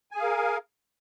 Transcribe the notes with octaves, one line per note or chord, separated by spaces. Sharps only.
G#4 A#4 F5 G#5